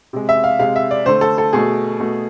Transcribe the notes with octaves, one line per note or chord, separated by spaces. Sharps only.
C3 G#3
E5
F5
C3 G#3 F5
E5
D5
D3 A3 C5
A4
A4
B2 A3 G#4
B2 A3